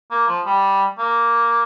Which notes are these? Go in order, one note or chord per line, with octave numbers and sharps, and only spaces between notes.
A#3
F3
G3
A#3